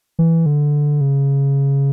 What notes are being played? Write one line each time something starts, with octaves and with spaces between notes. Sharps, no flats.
E3
D3
C#3